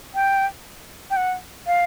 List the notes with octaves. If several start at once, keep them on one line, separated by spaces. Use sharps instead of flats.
G5
G5
F#5
F5